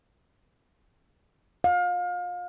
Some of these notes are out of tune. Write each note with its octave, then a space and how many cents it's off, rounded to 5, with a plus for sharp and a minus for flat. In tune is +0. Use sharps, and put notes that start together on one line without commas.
F5 +30